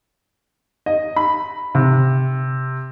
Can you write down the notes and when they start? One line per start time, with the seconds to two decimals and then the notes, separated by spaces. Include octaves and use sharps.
0.86 D#5
1.16 B5
1.75 C3